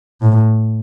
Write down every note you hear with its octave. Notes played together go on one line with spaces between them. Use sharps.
A2